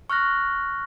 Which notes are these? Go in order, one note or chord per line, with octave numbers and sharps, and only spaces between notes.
C#6 F6 F#6 A#6